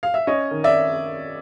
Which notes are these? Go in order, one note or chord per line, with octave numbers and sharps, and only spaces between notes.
F5
E5
C#4 C#5 D#5
D#3
D5 E5